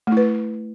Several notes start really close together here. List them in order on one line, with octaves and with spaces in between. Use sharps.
A3 E4 B4